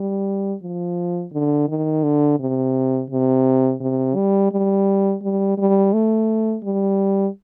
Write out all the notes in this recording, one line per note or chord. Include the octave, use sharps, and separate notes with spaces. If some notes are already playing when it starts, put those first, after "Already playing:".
Already playing: G3
F3
D3
D#3
D3
C3
C3
C3
G3
G3
G3
G3
A3
G3